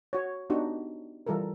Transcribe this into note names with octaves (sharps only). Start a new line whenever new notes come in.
F#4 C#5
B3 D4 D#4 F#4 G4
E3 G3 F4 A4 A#4